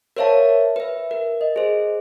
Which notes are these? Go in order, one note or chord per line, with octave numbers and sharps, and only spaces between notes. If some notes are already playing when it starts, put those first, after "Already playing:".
A#4 C5 C#5 E5 F5 A5
B4 E5
A#4
D#5
G#4 C5